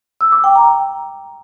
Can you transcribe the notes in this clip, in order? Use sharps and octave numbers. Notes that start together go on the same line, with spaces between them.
E6
D6
G5
A#5